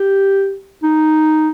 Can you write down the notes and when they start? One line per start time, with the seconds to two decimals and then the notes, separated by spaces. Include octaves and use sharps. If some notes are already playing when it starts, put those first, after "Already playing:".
Already playing: G4
0.83 D#4